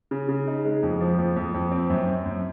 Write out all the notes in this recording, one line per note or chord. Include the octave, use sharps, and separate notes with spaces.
C#3
C#3
D#4
G#3
F2
F3
F2
F2
F2
C4
F#2
F#2
F#2